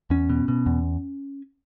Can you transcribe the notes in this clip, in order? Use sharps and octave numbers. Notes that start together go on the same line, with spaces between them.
E2 C#4
B2
B2
E2